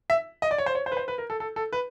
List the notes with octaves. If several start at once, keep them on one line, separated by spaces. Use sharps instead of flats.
E5
D#5
D5
C#5
C5
C#5
C5
B4
C5
B4
A#4
A4
A4
A4
B4